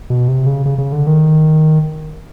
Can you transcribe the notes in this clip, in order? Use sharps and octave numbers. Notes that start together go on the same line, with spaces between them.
B2
C3
C#3
C#3
C#3
D3
D#3